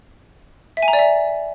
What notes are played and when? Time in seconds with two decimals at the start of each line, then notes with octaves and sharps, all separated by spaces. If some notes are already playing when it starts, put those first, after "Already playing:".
0.77 E5
0.82 G#5
0.88 A#5
0.93 D5
0.99 E5